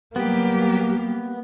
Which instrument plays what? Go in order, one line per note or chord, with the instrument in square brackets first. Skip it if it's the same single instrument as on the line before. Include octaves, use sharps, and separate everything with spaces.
[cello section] F#3 G3 G4 [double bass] A#3 [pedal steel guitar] B3